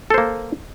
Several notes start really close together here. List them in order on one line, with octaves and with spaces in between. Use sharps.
A4 C5 A#3